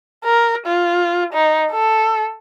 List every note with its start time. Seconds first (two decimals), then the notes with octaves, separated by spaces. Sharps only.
0.25 A#4
0.66 F4
1.33 D#4
1.72 A4